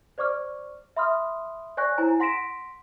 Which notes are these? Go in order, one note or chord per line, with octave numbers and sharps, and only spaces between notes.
C5 D5 C#6 D6 F6
E5 B5 C6 D#6 F6
C#5 D5 G#5 C#6 F#6 A#6
E4 C5 G#5 A#5
F#5 C6 A#6 B6 D7 E7